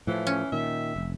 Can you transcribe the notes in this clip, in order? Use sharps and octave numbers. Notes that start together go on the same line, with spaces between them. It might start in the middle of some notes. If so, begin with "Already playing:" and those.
A2 E3 F3
C#4
A#2 D#3 E5
F1